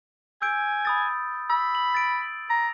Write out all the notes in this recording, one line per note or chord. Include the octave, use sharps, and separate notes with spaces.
G#5 E6 G6 D7
B5 D#6 A6
B5 E6
F#7
A6 D7
A#5